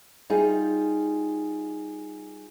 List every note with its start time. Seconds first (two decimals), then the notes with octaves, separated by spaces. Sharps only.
0.30 G3 D#4 F4 G#4